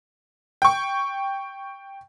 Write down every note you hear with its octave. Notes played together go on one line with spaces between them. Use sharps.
G5 C#6